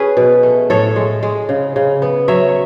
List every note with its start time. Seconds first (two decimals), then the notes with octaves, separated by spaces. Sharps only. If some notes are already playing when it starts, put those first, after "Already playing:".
Already playing: C#4 G#4 B4
0.17 B2
0.43 A3
0.70 A2 A4 C#5
0.96 G#3
1.23 G#3
1.49 C#3
1.76 C#3
2.02 B3
2.28 F#3 C#5 E5